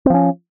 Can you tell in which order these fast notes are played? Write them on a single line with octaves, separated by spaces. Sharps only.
C4 F3 C#4